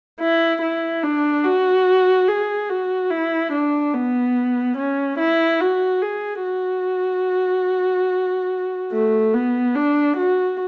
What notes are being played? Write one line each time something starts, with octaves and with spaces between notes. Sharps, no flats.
E4
E4
D4
F#4
G#4
F#4
E4
D4
B3
C#4
E4
F#4
G#4
F#4
A3
B3
D4
F#4